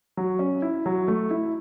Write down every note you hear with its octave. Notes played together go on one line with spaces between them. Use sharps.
F#3
C#4
E4
F#3
A3
E4